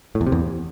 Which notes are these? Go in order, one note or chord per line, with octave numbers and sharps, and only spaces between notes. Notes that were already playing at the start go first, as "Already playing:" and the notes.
A2
E2
C3
E2